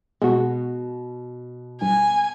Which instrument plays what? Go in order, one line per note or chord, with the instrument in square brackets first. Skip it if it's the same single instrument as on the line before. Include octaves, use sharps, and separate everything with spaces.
[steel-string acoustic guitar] B2 [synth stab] G#3 F#4
[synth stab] G2 [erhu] G#5